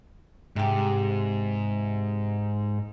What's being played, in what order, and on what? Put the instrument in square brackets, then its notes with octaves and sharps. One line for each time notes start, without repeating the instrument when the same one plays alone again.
[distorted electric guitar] G#2 [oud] C3 G4